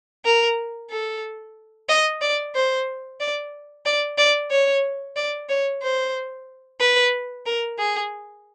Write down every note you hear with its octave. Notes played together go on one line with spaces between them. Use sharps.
A#4
A4
D#5
D5
C5
D5
D5
D5
C#5
D5
C#5
C5
B4
A#4
G#4